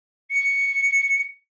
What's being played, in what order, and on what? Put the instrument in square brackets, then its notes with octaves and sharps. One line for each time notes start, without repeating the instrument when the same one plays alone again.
[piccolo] C#7